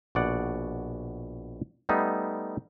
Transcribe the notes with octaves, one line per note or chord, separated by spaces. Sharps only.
A#1 B2 C#5 D5 F#5
G3 A3 B3 D#4